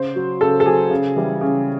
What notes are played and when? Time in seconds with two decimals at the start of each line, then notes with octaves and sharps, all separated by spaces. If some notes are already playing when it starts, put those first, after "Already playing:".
Already playing: C#3 C5
0.16 F#3
0.41 C#3 A4
0.60 A4
0.66 F#3 G#4
0.91 C#3
1.16 E3 G3
1.41 C#3